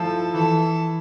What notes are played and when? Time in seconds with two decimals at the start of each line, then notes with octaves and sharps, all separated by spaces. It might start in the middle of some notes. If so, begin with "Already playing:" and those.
Already playing: F3 E4 A4
0.34 E3 A4